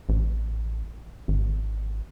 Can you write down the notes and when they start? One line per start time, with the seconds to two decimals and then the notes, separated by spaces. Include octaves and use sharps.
0.09 A1
1.28 G#1